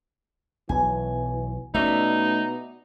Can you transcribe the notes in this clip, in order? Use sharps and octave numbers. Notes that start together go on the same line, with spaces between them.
B1 B2 E3 F#3 G#5
B2 A3 A#3 C#4 D#4 D5 E5